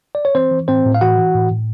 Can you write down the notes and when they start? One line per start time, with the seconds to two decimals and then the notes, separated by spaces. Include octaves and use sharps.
0.15 D5
0.25 C#5
0.35 E3 C4 C5
0.51 E3
0.68 A2 C4 C5
0.85 A2
0.95 F5
1.01 E3 F#4 F#5
1.18 E3
1.35 A2
1.51 A2